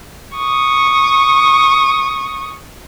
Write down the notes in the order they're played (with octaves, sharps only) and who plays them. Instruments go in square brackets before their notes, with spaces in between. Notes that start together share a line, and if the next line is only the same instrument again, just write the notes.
[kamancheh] C#6 D#6